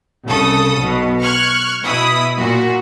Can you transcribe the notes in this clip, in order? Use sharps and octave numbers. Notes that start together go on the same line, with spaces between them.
C2 C#3 A4 D#6
B1 B2
C#6 F6 F#6 G#6
B2 E4 B5 D#6
A#2 F#4